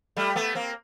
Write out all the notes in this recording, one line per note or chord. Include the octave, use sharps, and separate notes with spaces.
G3 A3
A3 B3
A#3 C4